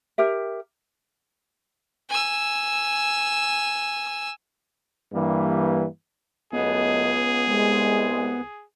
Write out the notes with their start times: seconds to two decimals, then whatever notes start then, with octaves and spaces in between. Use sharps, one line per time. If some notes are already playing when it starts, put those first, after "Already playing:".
0.18 G4 A#4 E5
2.09 G#5 E6
5.13 G2 E3 G3 A#3
6.53 C#2 F#2 A3 B3 G#4 D#5
7.48 C2 G#3